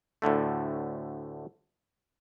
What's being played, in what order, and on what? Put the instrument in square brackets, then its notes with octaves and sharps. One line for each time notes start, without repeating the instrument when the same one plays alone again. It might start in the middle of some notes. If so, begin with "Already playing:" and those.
[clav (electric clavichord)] D2 A2 D3 A3